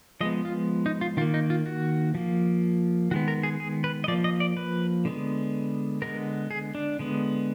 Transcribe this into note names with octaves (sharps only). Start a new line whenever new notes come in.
F3 G#3 B3 D#5
F4
D#4
F4
D#3 A#3 F4
D#4
F4
F#4
F3 A#3
D#3 G#3 B3 F#4
A#4
G#4
G#4
B4
D#5
F3 A#3 D5
D#5
D5
B4
D3 G#3 B3
D3 G#3 B3 A#4
G#4
D4
D3 G#3 B3